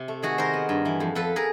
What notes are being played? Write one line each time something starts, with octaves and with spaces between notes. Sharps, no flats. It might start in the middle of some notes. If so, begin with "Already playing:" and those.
Already playing: C3
A3
D#3 F#4 G#4
D#3 A#4 C5
B3
G2
E3
F2
F2 A4 B4
G#4 A#4